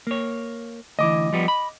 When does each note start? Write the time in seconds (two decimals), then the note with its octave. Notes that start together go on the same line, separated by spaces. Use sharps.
0.07 A#3 C#5
0.99 D2 E3 D#5 D6
1.33 F3 G3 B3
1.48 B5